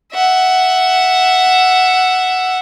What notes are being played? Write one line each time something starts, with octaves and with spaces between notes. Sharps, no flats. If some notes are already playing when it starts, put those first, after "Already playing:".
E5 F#5